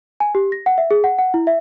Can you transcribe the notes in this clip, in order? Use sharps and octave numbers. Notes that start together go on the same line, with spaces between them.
G#5
G4
A#6
F#5
E5
G#4
F#5
F#5
E4
E5